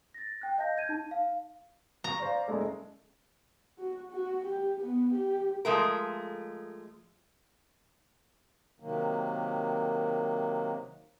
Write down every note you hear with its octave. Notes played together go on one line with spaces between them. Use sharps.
A6 A#6
G5 F#6
D#5 F5 A5 G6 A#6
G6 G#6 D#7
D#4 A5
F5
A#5 C#6
C5 D5 F5
F#1 G#3 A4
F#4
F#4
G4
B3
G4
F3 G#3 A3 A#4
C3 D#3 F#3 A#3